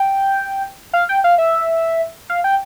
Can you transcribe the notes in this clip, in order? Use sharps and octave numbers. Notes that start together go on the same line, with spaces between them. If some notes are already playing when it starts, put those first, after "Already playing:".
Already playing: G5
F5
G5
F5
E5
F5
G5